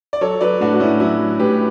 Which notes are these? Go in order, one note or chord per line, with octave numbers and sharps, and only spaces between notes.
D5
F#3 A4 C#5
F#3 B4 D5
A2 D4 F#4
F#4
A2 C#4 E4
F#3 C#4 E4
F#3
A2 G4 B4